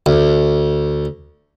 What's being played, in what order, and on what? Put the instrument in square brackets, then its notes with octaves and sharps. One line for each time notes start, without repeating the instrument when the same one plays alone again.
[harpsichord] D2